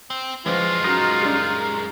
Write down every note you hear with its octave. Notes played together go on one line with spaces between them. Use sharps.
C4
F#2 E3 F3 G#3 F4
F#3 C#4 D#4 A#4
G3 C#4 D4